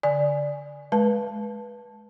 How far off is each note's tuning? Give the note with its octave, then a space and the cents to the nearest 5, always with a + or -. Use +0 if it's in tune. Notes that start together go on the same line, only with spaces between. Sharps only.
D3 -35 D5 +0 G#5 +0
G#3 +30 B4 -20 A5 +0